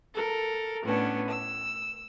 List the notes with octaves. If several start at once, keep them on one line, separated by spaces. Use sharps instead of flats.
A4 A#4
A2 B3 C#4 D4
E6